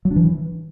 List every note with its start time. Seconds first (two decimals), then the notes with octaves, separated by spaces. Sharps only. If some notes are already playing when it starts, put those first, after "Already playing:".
0.05 F#3
0.11 D4
0.16 E3